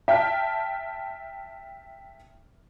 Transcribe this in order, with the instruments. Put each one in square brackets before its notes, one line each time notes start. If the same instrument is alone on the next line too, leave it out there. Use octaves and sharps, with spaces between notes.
[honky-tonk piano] E5 G5 A5 F6